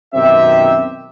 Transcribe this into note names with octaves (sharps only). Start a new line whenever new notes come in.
F#2 B2 D#3 C4 G4 E5